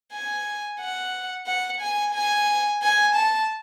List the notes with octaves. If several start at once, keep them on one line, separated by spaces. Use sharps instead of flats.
G#5
F#5
F#5
G#5
G#5
G#5
A5